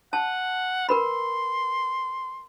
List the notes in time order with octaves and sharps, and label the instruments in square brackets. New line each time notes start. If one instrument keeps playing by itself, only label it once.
[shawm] F#5 [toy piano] A5
[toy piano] A#4 B4 B5 [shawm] C6